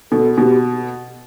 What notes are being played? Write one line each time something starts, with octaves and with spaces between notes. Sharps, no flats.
B2 A4
B2 G4